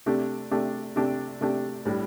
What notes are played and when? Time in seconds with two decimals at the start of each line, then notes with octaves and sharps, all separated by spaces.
0.06 C3 A3 D4 G4
0.51 C3 A3 D4 G4
0.96 C3 A3 D4 G4
1.41 C3 A3 D4 G4
1.85 A2 G3 D4